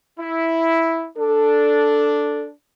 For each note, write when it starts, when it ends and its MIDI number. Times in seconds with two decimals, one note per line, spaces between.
0.19 1.07 64
1.18 2.53 62
1.18 2.45 69